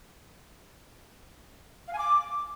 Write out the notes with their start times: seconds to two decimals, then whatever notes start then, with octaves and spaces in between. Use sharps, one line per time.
1.88 F5
1.93 G#5
1.98 D6